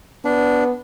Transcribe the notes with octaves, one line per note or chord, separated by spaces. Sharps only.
B3 D4